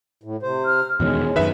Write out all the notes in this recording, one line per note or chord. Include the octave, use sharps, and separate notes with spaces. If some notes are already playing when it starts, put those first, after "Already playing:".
A2
C3 C5
F6
E2 B2 D#3 G#3 C#5
F#2 D#3 B4 E5